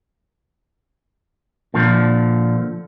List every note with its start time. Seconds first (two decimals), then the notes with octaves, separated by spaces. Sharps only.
1.74 A#2 D3 F3